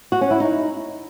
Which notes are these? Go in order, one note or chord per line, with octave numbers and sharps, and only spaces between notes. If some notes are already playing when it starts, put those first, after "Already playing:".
F#4
C#4
E4
D#4